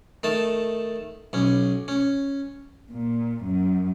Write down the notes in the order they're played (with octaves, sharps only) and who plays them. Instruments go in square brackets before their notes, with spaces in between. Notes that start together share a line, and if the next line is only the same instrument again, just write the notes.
[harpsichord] D#3 A3 A5
B1 C#4
C#4
[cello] A#2
F#2